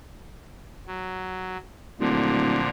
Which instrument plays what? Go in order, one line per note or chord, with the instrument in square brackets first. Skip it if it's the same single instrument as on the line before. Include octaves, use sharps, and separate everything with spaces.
[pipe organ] F#3
[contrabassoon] D1 [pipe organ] A#2 D3 F3